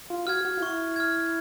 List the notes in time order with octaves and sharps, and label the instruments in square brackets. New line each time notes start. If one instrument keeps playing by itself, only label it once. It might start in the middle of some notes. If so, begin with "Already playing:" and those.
[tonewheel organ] F4
[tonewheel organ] F#4 [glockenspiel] F6 G#6
[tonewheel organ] F#4
F4
[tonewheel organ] E4 [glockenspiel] C#6
[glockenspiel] F6 G#6